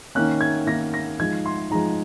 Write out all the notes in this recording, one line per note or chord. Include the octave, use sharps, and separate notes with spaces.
D#3 A#3 C#4 F#6
G#6
D#3 A#3 C#4 A#6
A#6
F3 G#3 D#4 G#6
C6
F3 G#3 D#4 A#5